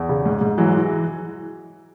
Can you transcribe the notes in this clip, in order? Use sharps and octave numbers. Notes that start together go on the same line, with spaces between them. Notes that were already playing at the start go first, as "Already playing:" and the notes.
Already playing: E2
C#3
G#2
G#2
E3 F#3 G#3
E3